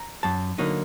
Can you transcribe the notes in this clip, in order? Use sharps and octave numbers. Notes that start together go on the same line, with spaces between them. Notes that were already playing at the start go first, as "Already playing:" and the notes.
Already playing: A#5
F#2 A5
D3 F#3 A#3 D#4